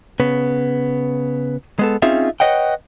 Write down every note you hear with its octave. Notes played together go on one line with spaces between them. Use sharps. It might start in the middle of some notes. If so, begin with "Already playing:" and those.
C#3 B3
G#3 B3 A4
C4 C#4 D#4 F4 G#4 E5
B4 C#5 D#5 F#5 G5